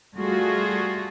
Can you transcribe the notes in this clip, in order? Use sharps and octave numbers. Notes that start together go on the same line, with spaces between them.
G3 A3 F4 F#4 G#4